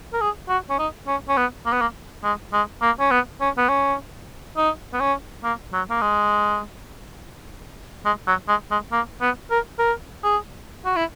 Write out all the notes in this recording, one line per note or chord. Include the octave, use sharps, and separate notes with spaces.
A#4
G#4
F#4
C#4
D#4
C#4
C#4
B3
A#3
B3
A#3
G#3
G#3
A#3
C#4
B3
C#4
B3
C#4
D#4
B3
C#4
A#3
F#3
A#3
G#3
G#3
F#3
G#3
G#3
A#3
B3
A#4
A#4
G#4
F#4
E4